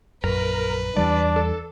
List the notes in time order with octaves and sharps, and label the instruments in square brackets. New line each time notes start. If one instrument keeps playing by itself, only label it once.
[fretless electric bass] A#1 F#2 [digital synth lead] A#4 [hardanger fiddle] B4
[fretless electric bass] E2 E3 G3 [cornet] D4 [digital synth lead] D5
[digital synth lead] A4